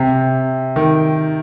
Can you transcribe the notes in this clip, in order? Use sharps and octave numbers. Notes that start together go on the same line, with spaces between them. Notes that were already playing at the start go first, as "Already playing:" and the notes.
Already playing: C3
D#3